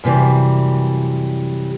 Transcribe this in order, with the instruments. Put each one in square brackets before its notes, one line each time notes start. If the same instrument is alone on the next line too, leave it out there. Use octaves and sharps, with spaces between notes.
[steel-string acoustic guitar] F#2 C3 E3 G3